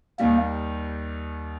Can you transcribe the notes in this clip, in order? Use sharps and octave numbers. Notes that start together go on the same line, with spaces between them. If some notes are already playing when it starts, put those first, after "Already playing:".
D#2 D#3 G3 A#3